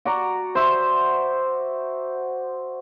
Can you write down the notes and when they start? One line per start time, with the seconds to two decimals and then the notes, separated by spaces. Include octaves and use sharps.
0.05 F#4 D5 A#5
0.55 C5 E5